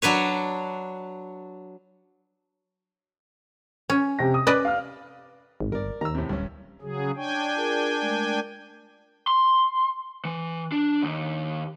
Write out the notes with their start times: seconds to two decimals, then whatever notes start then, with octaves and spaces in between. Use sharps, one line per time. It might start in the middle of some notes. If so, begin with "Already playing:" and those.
0.02 F#3 D4 B4 C#5
3.90 C#4
4.19 C3 G5 A#6
4.34 D#6
4.47 C#4 B4 D5 D#5 D6
4.65 F5 F6
5.60 G#1
5.72 G1 A#4 D5
6.01 D#2 A#5 E6
6.15 A2 C3
6.29 D1 G2 C#4
6.82 C#3 F#3 G#4
7.16 D4 C#5 G5 G#5 C#6
7.55 F4 G#4 A#4
8.01 G#3 A3 A#4
9.27 C6
10.25 E3
10.72 D4
11.02 D#2